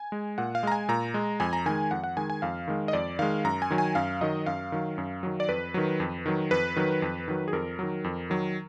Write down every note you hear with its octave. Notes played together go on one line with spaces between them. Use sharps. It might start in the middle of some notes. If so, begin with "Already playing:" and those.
Already playing: G#5
G#3
A#2 F#5
F5
G#3 A#5
G#5
A#2 A#5
G#3
F2 G#5
A#5
D#3 G#3 G#5
F2 F#5
F#5
D#3 G#3 G#5
G#5
F2 F5
D#3 G#3
D#5
F2 D5
D#3 G#3 F5
F#2 A#5
G#5
D#3 F#3
G#5
F#2 F5
D#3 F#3 D#5
F#2 F5
D#3 F#3
F#2
D#3 F#3
D5
F2 B4
D#3 F#3
F2
D#3 F#3
F2 B4
D#3 F#3
F2
D#3 F#3
G#4
F2 A#4
D#3 F#3
F2
D#3 F#3